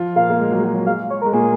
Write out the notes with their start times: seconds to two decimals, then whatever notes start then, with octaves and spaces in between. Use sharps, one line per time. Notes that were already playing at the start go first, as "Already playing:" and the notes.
Already playing: F3 F4
0.16 A#2 A#3 F5
0.30 A#3
0.39 G#3
0.51 F#3
0.57 G#3
0.64 F#3
0.75 F#3
0.86 G#3 F5
1.10 C#5
1.22 A#4
1.25 G#3
1.33 A#2 A#3 G#4